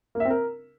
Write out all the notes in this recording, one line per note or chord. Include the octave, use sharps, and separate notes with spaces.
A#3
E5
C4
A#4